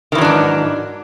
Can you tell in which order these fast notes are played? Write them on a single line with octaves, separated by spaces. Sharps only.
D#3 E3 F#3 D4 G#2